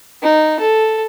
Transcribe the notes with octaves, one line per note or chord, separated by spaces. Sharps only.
D#4
A4